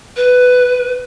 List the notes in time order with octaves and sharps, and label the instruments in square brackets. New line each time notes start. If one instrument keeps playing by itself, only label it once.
[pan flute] B4